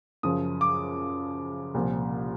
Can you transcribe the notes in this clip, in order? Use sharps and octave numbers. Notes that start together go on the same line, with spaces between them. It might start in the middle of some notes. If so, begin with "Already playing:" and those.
F#2 C#3 F3 D#6
D6
C2 A#2 F3